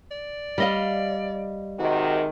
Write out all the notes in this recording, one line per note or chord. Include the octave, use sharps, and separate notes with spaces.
D5
G3 D#5 F5
G#2 C3 D#3 F#4